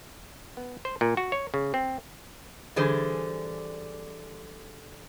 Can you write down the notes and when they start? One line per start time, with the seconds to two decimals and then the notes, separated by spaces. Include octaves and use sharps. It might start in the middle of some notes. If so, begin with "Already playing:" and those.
0.57 B3
0.85 C5
1.01 A#2
1.17 F#4
1.32 C#5
1.54 C#3
1.74 C4
2.76 D3 E3 G3 G#4 C5